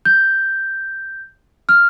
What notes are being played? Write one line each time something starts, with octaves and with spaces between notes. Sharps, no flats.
G6
F6